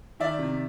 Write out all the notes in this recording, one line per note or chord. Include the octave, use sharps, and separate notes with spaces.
D#3 D5 E5
C3